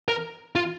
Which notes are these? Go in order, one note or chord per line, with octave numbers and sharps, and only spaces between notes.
A#4
F4